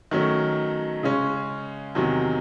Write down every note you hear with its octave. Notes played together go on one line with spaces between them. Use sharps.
D#3 F#3 A3 C#4
C#3 G#3 C#4
E2 C3 D#3 F#3